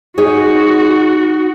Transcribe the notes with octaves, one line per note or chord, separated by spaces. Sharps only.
D#4 F#4 G#4 C#5